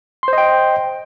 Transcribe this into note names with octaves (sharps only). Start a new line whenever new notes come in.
C5 D#5 G5 C6